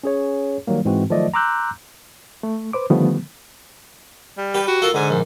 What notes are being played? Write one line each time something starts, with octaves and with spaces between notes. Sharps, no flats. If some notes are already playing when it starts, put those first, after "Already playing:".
C#4 G#4 C#5
D#3 F#3 G3 A#3
G#2 E3 G#3 C4 F#4
D#3 F3 F#3 A3 D5 D#5
A#5 C6 D6 E6 F#6 G6
A3
B4 C5 D6
D3 D#3 F3 G3 A3 B3
G3
G4 B4
F#4
F4 A4 A#4
G#2 D3 G#5
A#1